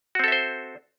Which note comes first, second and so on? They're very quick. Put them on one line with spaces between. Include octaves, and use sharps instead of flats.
F#4 C4 A4 E5 C5